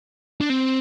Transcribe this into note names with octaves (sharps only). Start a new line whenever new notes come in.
D4
C4